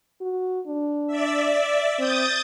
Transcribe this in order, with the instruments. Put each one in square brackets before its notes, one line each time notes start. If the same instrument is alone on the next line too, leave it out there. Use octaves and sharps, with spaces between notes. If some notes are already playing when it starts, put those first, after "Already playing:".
[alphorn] F#4
D4
[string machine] D5 E5
[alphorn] C4 [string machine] D#6 G6 A6